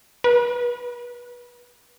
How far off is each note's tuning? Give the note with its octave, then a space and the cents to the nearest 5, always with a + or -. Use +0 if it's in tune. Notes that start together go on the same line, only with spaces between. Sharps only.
B4 -25